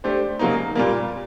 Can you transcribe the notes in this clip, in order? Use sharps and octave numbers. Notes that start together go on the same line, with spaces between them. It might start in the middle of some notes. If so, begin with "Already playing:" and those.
A3 D4 G4 C5
C#3 F#3 A#3 D#4
A#2 G3 A#3